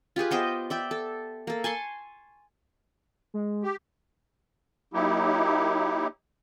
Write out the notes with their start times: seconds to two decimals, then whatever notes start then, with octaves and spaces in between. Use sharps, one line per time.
0.16 F4 G4 G#4 B4
0.31 B3 C5 D#5 G5
0.70 D5 E5 G5
0.91 A4
1.47 A#3 A4
1.64 G#5 A5 C6 C#6
3.34 G#3
3.63 G4
4.94 F#3 A#3 D#4 E4 G4